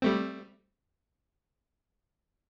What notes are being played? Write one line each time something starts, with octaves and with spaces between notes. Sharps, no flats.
G3 A3 C4